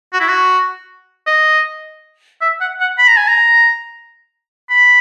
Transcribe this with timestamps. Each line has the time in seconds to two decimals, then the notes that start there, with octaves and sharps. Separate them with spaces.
0.13 F#4
0.20 E4
0.28 F#4
1.27 D#5
2.42 E5
2.61 F#5
2.80 F#5
2.98 B5
3.08 A#5
3.17 G#5
3.28 A#5
4.70 B5